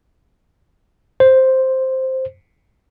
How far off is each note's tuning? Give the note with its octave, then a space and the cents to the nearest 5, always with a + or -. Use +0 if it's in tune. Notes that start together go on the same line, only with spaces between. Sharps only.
C5 +0